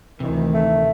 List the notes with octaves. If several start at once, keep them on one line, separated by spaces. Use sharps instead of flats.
D2 C3 D#3 E3
A3